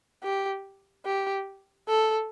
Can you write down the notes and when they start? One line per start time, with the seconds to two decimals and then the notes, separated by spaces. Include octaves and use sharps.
0.23 G4
1.06 G4
1.89 A4